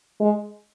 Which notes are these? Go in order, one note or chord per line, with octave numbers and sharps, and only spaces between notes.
G#3